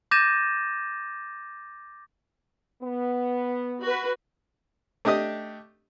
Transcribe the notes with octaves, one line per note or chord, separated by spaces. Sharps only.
D6 G6 A6 A#6 D#7 E7
B3
F#4 B4
A3 D4 G4 D#5 D#6